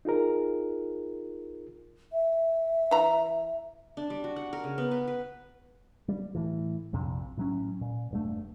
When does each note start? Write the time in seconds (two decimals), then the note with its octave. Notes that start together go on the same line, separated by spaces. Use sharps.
0.05 D#4 F4 G#4 A#4
2.13 E5
2.91 E3 A#5
3.97 D4
4.10 G3
4.24 F#4
4.36 F#5
4.53 A#4
4.64 C#3
4.78 B3
4.91 B4
5.08 B4
6.08 G3
6.35 A2 E3
6.93 A#1 F2 C3
7.37 A2 F#3 C#4
7.81 A#2
8.11 E1 G2 A3